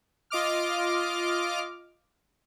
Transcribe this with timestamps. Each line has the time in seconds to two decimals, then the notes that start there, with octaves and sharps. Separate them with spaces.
0.30 F4 D#5 D6 F6